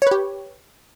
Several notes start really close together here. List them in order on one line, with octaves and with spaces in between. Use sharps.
C#5 B4 G4